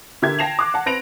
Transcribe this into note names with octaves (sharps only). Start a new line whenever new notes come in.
D3 G4 A#4 E5 G#6
G5 A5 A#6 C7 E7 F7
D6 F#6
F#5 A5
C4 B4 A#6 D7 F7 F#7